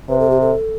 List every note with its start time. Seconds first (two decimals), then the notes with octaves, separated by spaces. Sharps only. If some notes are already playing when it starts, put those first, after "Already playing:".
0.09 C3 B4
0.19 A4
0.30 G4
0.41 A4